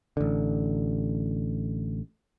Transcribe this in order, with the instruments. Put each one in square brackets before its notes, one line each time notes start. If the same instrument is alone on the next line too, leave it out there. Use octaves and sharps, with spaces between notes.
[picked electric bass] A1 D3